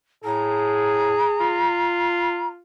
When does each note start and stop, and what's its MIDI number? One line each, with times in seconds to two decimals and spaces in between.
0.24 1.16 45
0.24 1.70 68
0.24 2.49 82
1.40 2.62 65